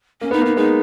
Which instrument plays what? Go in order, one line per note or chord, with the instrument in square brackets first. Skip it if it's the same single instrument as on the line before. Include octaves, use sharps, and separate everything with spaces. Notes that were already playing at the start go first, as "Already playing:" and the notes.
[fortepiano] A#3 [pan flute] C#4
[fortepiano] B3 [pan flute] D#4
[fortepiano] A#3
[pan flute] D#4
[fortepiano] G#3 B3 [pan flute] D#4